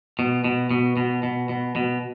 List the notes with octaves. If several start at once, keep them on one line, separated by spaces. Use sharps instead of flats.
B2
B2
B2
B2
B2
B2
B2